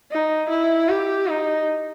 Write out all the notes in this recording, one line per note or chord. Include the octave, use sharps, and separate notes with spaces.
D#4
E4
G4
D#4